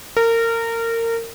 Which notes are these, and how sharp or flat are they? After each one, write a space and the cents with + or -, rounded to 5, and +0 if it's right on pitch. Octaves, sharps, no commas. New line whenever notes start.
A#4 -25